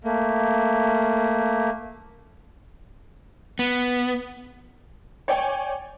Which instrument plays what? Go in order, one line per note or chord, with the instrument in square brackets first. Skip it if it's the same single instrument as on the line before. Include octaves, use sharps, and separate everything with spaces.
[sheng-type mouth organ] A3 A#3
[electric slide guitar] B3
[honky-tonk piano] C#5 D5 G5 G#5